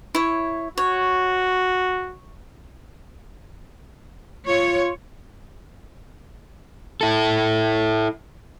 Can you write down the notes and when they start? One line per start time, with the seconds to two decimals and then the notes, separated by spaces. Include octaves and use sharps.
0.15 E4 C#5
0.78 F#4 C#5
4.47 F4 C#5
7.01 E4 A4